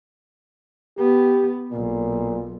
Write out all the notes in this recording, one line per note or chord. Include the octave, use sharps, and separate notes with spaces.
B3 G4
B1 A#2